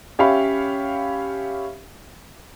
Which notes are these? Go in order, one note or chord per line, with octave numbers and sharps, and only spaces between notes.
C#4 G4 C#5 E5 F5 B5